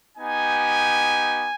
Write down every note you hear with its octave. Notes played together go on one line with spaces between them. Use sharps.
B3 D#4 G4 G#5